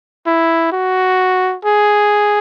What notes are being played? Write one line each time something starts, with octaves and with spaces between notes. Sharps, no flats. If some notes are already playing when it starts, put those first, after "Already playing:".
E4
F#4
G#4